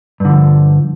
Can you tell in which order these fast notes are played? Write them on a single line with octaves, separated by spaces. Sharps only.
G2 D3 F3